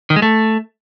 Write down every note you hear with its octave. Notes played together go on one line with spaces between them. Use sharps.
D#3
G#3
A3